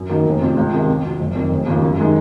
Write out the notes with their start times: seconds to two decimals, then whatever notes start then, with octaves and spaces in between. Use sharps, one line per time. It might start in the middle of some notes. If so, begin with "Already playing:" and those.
Already playing: F#2
0.09 D#3 F#3 A#3 D#4
0.26 F1
0.41 F2 C3 F3 C4
0.57 C#2
0.72 C3 D#3 G#3
0.88 F2
1.04 C3 F#3
1.20 F#1
1.35 F2 D#3
1.50 F1
1.66 D#2 C#3 F3
1.82 F#2
1.98 D#3 G#3 D#4